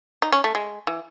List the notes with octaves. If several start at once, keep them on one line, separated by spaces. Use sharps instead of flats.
D#4
C#4
A3
G#3
E3